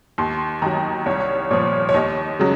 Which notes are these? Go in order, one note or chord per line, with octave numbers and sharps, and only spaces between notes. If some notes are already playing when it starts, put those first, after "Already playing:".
D#2 C6
D#3 F#3 A#5
C2 C#5
A#2 F3 C#5
C#5
D#2 D#5
C#3 F#3